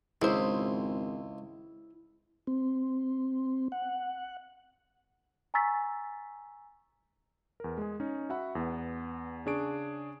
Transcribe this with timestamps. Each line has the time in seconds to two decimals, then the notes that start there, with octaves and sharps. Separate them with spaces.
0.22 G#1 C#2 E4 G#4 C5
2.47 C4
3.72 F#5
5.54 G#5 A#5 C#6 E6 A6 B6
7.60 E2 A#4
7.78 G#3 G#4
8.00 C#4 D#4
8.30 F#4 E5 F#5 B5
8.55 E2 B3
9.46 C#3 C#4 D4 G#4 C#6 D7